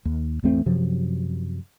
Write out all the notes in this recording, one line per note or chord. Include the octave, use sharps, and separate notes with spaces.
D#2
G#1 E2 A3 C4
F#2 C3 F3 F#3